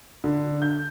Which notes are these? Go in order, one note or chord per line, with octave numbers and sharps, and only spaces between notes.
D3
G6